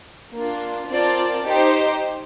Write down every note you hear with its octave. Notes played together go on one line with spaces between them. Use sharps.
A#3 D4 F4
C4 F4 A#4 D5 A5
D#4 G4 C5